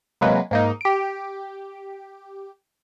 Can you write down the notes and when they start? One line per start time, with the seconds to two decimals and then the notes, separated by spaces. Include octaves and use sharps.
0.21 C3 F#3 G#3 A#3 B4
0.51 G#2 A#3 D#4
0.81 G4 D7